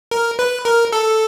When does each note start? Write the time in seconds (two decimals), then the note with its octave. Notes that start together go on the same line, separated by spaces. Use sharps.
0.11 A#4
0.39 B4
0.65 A#4
0.93 A4